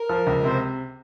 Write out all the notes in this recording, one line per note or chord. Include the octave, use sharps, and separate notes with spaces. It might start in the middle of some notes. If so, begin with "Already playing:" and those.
Already playing: A#4
F3
C#2
C3 C5